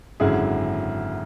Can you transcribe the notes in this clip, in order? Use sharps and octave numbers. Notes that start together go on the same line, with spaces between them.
G#1 F#2 D3 E4 G#4